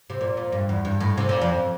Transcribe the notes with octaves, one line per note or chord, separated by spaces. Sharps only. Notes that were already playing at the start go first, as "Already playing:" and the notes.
C3
A#2
A#2
G2
E2
G2
A2
C3
A#2
F2